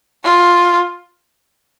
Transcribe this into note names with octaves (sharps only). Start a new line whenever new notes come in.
F4